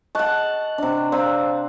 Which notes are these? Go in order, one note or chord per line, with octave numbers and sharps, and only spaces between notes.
D#5 F#5 A5 C#6 F#6
C3 D4
C4 D5 F5 A#5